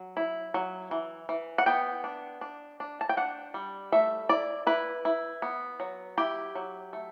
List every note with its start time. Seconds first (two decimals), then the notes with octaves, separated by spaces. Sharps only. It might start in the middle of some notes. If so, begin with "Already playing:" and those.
Already playing: F#3
0.17 E4
0.54 F#3
0.91 E3
1.29 E3
1.58 F#5
1.66 B3 G5
2.04 D4
2.41 D4
2.80 D4
3.01 A5
3.09 G5
3.17 D4 F#5
3.54 G3
3.92 A3 E5
4.29 E4 D5
4.66 E4 B4
5.05 E4
5.42 B3
5.80 F#3
6.17 E4 G4
6.55 F#3
6.93 A3